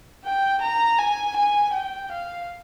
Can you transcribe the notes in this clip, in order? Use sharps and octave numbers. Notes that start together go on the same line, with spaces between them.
G5
A#5
G#5
G#5
G5
F5